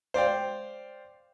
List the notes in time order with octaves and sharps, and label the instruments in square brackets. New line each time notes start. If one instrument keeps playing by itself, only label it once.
[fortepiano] C5 D5 F5 G5